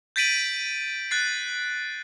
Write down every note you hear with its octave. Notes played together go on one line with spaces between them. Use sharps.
G6 A6 B6 D7 D#7 F#7
F#6 A6 C7